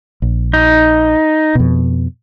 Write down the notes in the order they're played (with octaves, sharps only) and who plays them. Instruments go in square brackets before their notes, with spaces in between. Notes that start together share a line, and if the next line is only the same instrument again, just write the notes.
[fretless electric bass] A#1
[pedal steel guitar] D#4
[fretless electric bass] F2 B2